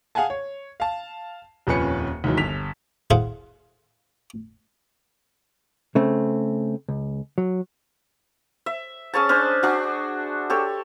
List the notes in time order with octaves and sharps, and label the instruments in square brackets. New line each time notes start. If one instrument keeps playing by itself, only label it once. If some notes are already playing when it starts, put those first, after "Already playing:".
[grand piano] G#4 F5 F#5 G#5 A5
C#5
F5 A5
D#1 F2 F3 C#4 B4 C#7
D#2 G#2 E3 F#3
G1 B6 F7
[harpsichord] E4 G#4 C5 F5 F#5
[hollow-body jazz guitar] C#3 A3 C4
C#2
F#3
[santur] E5
C#4 G#4 C#5 A5
C#4 D4 C5
D4 F#4
G4 A4 C#5